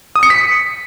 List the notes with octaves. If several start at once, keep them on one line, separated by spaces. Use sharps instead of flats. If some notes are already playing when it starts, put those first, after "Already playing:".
D#6
C#7
B6